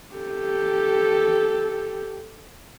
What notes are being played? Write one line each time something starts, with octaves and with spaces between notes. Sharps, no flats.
G4 A4